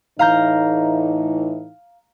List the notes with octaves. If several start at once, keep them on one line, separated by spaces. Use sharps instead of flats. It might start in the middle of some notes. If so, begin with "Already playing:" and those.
A2 E3 D#4 F5 A#5 G6